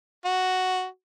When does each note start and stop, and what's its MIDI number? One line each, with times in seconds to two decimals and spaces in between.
0.25 0.86 66